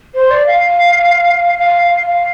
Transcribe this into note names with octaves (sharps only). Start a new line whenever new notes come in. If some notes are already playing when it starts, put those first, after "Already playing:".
C5
D5
F5
F5
F5
F5